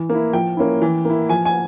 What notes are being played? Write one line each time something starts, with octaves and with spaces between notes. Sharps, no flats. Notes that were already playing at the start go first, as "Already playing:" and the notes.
Already playing: E3
A#3
E4
F3 G5
A#3 C#4 E4
E3
A#3 E4
F3 G#5
G#5